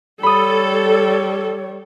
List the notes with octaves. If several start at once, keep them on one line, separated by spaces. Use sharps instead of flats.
G3 A4 C#5 B5 D#6